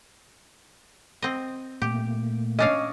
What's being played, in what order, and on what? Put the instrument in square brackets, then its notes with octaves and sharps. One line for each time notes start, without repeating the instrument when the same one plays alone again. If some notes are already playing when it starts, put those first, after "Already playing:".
[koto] C4 D#5
[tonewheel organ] A#2 A3 A#3 [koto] G4
[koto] C#4 D4 F5 [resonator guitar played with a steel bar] C#5 D#5